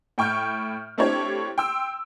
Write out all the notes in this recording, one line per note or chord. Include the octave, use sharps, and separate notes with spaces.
A2 G5 C#6 F6 G6
A3 C4 D4 E4 G4 C#5
G5 C6 E6